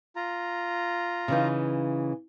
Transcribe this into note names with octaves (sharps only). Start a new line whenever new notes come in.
F4 A#5
C#3 E3 D#4